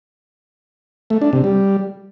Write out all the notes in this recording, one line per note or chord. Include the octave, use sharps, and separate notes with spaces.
A3
D4
C3
G3